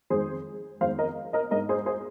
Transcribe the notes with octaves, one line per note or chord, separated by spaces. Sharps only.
F2 D#3 G#3 G#4 C5
F2 D#3 G#3 C5 F5
A#4 D#5
A#4 D#5
G#2 G#3 A#4 D#5
G#4 C5
G#4 C5